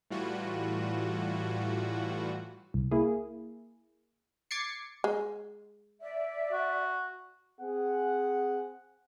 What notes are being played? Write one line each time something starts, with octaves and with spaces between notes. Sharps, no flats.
A2 E3 G3 F4 F#4
C2
A#3 E4 G#4
D6 G#6 A6 C7 C#7
G#3
D5 E5
F#4
C4 G#4 F#5